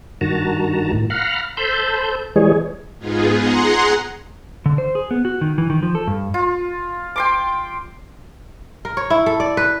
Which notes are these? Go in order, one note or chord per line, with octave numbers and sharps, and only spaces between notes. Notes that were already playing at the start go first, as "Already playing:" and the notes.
G2 D#3 F#4 A5 A#5
A2
F5 F#5 A#5 B5 F6
A4 C5 A5 B5 C6 G6
E3 G3 G#3 G#4 C#5
G#2 B3 D#4 F4 G#4
G#4 F#5 A#5 C6
D3
C5
G#4
B3
F#4
D#3
E3
D#3
F3
A4
G2
F4
G5 C6 D6
A#4
C#5
E4
A4
D5
B4